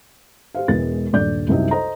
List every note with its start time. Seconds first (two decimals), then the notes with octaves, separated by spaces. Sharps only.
0.55 G4 C5 F5
0.68 E1 E3 G#3 B3 A6
1.13 D#1 G2 D5 G6
1.48 C2 F#2 C3 D#4 D#5 E5
1.71 A4 C5 D#5 A#5